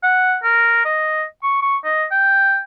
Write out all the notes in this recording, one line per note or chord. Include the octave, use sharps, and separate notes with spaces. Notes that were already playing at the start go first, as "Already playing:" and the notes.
F#5
A#4
D#5
C#6
C#6
D#5
G5